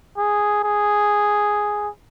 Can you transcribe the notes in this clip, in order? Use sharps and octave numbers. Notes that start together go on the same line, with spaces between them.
G#4
G#4